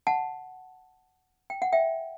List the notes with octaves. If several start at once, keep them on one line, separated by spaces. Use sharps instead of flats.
F#5 A5
G5
F#5
E5 G5